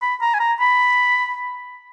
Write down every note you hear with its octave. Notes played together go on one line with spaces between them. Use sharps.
B5
A#5
G#5
A#5
B5